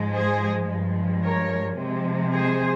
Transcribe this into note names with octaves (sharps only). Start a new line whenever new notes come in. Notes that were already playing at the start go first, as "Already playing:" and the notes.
Already playing: G#2 F3 G#3
G#4 C5
G2 F3 G#3
A#4 C#5
C3 F3 G#3
G#4 C5